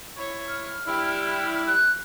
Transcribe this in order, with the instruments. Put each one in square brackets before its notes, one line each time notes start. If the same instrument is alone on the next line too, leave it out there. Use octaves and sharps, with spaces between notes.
[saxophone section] E4 C#5
[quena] F6
[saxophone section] G3 D4 G4 [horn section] E4
[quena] F#6